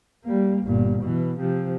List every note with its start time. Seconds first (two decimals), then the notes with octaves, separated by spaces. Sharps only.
0.24 G3 A#3
0.64 G1 A#2
1.04 B2 E3
1.40 C3 F3